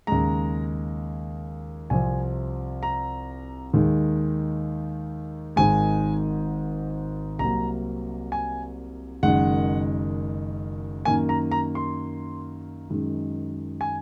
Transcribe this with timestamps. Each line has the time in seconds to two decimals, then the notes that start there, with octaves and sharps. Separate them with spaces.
0.07 D#2 C#3 G#3 A#5
1.90 C2 C3 F3 G#5
2.83 A#5
3.73 D#2 D#3 G#3
5.56 G#1 G#2 D#3 G#3 G#5
7.39 C2 C3 F#3 A#3 A#5
8.32 G#5
9.23 F#1 F#2 D#3 G#3 F#5
11.05 F#2 D#3 A#3 G#5
11.29 A#5
11.51 A#5
11.75 C6
12.90 F#2 D#3 G#3
13.81 G#5